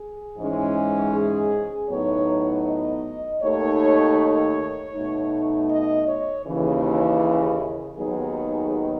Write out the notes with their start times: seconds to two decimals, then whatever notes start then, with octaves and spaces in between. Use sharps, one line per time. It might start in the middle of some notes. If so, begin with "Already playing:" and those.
Already playing: G#4
0.37 G#2 E3 G#3 C#4
1.13 G#4
1.89 A2 F#3 B3 D#4 C#5
2.65 D#5
3.41 D#2 D#3 A3 D#4 C#5
4.17 C#5
4.93 B2 A3 D#4
5.70 D#5
6.07 C#5
6.46 D#2 C#3 E3
7.98 D#2 D#3 F#3 B3 D#4 G#4